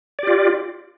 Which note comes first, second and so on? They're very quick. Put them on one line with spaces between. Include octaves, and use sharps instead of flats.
D5 G4 F4